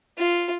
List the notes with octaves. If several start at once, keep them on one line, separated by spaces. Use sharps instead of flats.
F4